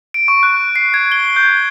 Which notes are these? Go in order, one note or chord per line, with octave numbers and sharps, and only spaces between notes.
D7
C#6
F#6
C7
G#6
G7
G6